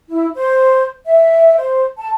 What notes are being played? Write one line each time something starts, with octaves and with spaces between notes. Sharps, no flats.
E4
C5
E5
C5
A5